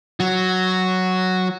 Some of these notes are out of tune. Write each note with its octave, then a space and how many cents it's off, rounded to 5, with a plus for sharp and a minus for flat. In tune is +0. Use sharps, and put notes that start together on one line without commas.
F#3 +0 F#4 +0